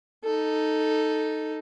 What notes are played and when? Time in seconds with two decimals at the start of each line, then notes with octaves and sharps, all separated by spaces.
0.24 D#4 A4